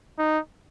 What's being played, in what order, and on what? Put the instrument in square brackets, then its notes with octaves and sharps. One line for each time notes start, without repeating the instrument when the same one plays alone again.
[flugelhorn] D#4